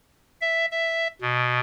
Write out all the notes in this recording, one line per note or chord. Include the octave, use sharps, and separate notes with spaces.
E5
E5
B2